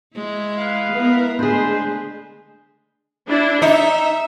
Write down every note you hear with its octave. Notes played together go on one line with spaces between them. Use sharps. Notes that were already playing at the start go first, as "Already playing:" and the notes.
G#3 E4
B4 F5
G#3 B3 E4 A#4
D3 G#3 A3 D4 G#4 B4 C5
D4 E4
D#4 E5